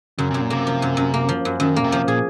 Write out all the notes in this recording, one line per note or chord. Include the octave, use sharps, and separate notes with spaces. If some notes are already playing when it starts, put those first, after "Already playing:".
F#2 C#3
F#2 C3
A#2
C3 A#3
F3
F#2
F#2
A#3
F3
F#2
F#2 D#3
A#2 A#3
C3
F3
A#2 G#4